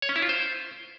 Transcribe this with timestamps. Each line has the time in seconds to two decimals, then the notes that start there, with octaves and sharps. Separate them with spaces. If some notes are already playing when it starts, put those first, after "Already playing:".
0.02 C#5
0.09 C#4
0.16 E4
0.22 F4
0.29 C5